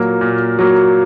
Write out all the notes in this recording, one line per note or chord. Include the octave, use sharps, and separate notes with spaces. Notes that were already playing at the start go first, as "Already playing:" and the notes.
Already playing: A#2 F#3 A#3
A#2
F#3 A#3